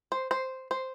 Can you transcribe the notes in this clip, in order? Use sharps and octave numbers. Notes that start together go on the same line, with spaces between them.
C5
C5
C5